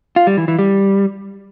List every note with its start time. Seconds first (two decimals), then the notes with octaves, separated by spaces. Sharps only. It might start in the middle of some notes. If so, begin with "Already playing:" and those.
0.16 F4
0.27 G3
0.37 E3
0.48 E3
0.59 G3